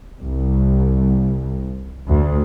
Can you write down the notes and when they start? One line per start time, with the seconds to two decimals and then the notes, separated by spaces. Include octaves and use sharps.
0.21 C2
2.08 D2